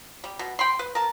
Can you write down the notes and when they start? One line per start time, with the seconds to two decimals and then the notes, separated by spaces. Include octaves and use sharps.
0.24 G3
0.39 B2
0.59 G5 B5 C6
0.79 B4
0.95 A#4 A5